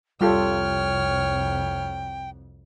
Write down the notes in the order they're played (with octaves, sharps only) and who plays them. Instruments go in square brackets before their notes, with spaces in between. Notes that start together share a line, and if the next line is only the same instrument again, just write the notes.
[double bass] C2 F2 [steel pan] G3 F4 A4 [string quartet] C#5 F6 [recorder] G5